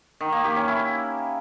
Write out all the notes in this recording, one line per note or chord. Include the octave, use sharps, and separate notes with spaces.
D#3
A#3
G4
C#4
E4